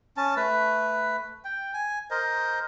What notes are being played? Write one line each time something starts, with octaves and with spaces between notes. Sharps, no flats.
C#4 A5
A3 B4
G5
G#5
A#4 C5 D#5